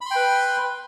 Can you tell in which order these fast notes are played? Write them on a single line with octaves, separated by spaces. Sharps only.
B5 C6 G5 B4